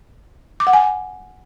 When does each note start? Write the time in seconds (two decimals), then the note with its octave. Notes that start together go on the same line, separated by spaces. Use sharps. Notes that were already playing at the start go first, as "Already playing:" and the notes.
0.60 D6
0.67 F#5
0.73 G#5